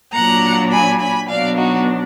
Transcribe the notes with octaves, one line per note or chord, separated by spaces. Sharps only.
A#2 F#3 D4 F#5 A#5
G#5 B5
G#5 B5
B2 F#3 B3 D4 D5 F5
D#4 F#4